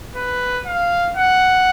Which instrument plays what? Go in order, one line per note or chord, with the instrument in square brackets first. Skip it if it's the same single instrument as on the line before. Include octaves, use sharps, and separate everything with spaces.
[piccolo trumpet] B4
F5
F#5